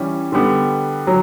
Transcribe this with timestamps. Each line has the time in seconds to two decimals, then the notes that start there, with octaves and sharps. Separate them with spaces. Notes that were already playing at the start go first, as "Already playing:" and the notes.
Already playing: E3 G3 C#4
0.32 D3 G3 B3
1.07 F#3